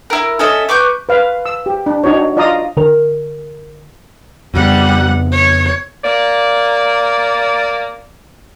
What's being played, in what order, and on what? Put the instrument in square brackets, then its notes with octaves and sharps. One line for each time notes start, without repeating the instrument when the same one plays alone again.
[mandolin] E4 A#4
C#4 A4 D#5 E5
B4 C#6 D6 G6
[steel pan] B4 F5
E6
G4
D4
D4 D#4 F#4 C#5
F4 D5 D#5 F5 A#5 D#6
[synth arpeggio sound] D3 A#4
[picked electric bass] F2 C#3 B3 [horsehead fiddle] G3 F#5
[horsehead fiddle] C#5
[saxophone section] A#3 D5